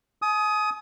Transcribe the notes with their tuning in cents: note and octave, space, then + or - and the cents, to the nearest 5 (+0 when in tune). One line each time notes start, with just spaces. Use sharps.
G#5 +40 D#6 +15